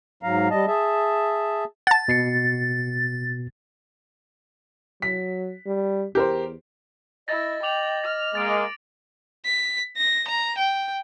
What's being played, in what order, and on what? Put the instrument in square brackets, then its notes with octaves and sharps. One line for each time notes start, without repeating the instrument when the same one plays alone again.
[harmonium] G#2 F#3 F5 A#5
G3 D#5 A5
G#4 E5 A5
[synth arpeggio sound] F#5 A5 [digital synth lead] A6
[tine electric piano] B2 C7 C#7
[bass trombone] F#3 [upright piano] B6
[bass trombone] G3
[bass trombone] E2 [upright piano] G4 A#4 C5
[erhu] E4 [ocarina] D#5 [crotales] A6 A#6
[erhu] G5 [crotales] D6 F7 F#7
[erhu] F6 [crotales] A6
[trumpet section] G#3 A#3 [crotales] A6 D7
[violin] B6
A#6
A#5
G5